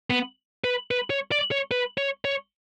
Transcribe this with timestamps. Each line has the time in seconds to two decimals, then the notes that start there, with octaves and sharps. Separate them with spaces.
0.10 B3
0.64 B4
0.91 B4
1.10 C#5
1.32 D5
1.51 C#5
1.71 B4
1.98 C#5
2.25 C#5